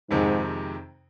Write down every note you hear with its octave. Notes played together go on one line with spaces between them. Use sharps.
F2 G#2 C3 D#3 G#3 C4